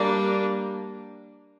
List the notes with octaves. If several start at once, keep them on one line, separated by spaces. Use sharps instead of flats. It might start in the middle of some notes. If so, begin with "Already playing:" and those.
Already playing: G3 A#3 D4